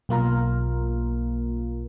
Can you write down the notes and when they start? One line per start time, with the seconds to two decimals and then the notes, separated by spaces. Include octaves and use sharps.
0.09 B1 A#3 F4 A#4